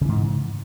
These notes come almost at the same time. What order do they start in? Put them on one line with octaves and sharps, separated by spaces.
C#3 E3 G#2